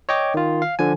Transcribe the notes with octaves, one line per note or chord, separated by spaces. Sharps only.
C#5 D#5 G5 D6
D#3 F4
F5
D3 F3 G#5